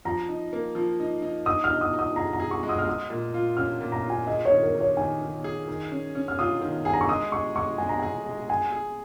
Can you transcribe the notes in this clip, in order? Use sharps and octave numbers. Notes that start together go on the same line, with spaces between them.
F3 A#5
D#4
A#3
F3
D#4
D#4
D#4 D#6
F6
D#4
D#6
D#4
D#6
G#4 A#5
A#5
G#4
C#6
G#3
D#6
F6
G#3 D#6
A#2
F4
C#4 F6
A#2
A#5
F4
G#5
G#4 D#5
C#5
D#3
A#4
D#3
C#5
D#3 G#5
D#3
G#4
D#3
C#4
C#4
F6
F4 D#6
D#3
G#4 G#5
A#5
C#6
G#3 D#6
G#3 C#6
G#3 C#6
G#3 G#5
A#5
G#4 G#5
G#3
G#4 G#5
G#4